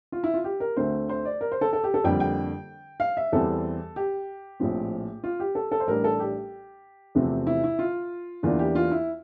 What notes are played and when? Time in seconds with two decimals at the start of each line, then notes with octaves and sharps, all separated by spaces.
0.12 F4
0.24 E4
0.34 F4
0.44 G4
0.60 A#4
0.77 D2 D3 A3 C4 C5
1.09 C5
1.25 D5
1.41 A#4
1.52 C5
1.61 A4
1.73 A4
1.84 G4
1.94 A4
2.04 F2 D3 G3 A#3 G5
2.20 G5
3.00 F5
3.17 E5
3.32 E2 E3 G3 C4 A4
3.96 G4
4.60 A#1 A2 F3 C4
5.24 F4
5.40 G4
5.55 A4
5.72 A4
5.80 C5
5.87 A1 A2 G3 D4 A#4
6.04 A4
6.20 G4
7.15 E2 C3 F3 A3 C4
7.47 E4
7.64 E4
7.79 F4
8.43 E2 E3 A#3 D4 F4
8.59 G4
8.75 F4
8.91 E4